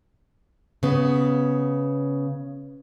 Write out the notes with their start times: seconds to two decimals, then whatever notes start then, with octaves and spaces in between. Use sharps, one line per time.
0.83 C#3 B3